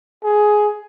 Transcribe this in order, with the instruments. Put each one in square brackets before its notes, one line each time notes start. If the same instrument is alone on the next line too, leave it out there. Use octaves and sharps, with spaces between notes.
[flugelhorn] G#4